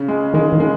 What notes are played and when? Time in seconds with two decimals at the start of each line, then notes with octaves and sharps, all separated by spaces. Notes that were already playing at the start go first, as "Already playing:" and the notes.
Already playing: C#3
0.08 G#3
0.34 D#3 G#3
0.53 D#3
0.60 G#3